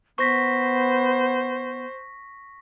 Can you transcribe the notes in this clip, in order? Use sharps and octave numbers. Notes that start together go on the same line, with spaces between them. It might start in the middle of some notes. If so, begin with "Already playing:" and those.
B3 C5 C#6 A#6 B6